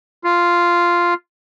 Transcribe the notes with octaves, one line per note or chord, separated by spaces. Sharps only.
F4